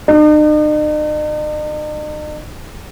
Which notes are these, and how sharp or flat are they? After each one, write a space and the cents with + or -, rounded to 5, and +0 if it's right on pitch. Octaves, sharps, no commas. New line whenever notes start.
D#4 -45